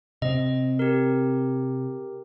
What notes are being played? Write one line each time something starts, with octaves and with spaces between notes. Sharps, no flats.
C3 C4 D#5
G4 A#4